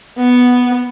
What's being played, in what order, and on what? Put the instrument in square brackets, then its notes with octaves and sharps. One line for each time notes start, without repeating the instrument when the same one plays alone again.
[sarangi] B3